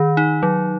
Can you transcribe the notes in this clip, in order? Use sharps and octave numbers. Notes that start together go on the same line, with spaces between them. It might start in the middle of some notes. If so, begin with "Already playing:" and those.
Already playing: D#3
D#4
F#3